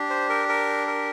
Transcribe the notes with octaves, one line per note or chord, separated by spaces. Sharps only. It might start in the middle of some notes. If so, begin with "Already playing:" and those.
Already playing: D4 G4
C5
A#4
A#4
A#4